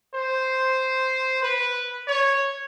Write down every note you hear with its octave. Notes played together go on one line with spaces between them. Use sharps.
C5
B4
C#5